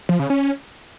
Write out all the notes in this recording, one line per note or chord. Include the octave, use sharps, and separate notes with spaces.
F3
C#3
C#4